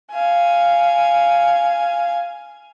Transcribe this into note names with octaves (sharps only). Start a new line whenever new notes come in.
F5 G#5